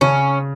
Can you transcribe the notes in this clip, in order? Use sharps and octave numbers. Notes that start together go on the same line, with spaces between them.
C#3 C#4